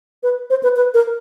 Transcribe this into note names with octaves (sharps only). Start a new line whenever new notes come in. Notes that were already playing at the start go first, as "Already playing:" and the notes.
B4
C5
B4
B4
A#4